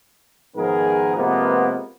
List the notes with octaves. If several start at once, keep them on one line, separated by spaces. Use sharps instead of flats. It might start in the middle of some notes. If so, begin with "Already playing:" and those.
G#2 D#3 F3 B3 G#4 A#4
C3 F3 G#3 A#3 B3